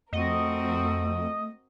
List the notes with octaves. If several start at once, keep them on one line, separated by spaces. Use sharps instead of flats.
F2 A3 C4 F#4 A#4 D#5